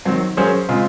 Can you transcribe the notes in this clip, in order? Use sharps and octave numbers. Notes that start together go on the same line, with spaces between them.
D#3 F#3 C4
F#3 A#3 C#4 G#4 C5
C#3 G#3 C4 F4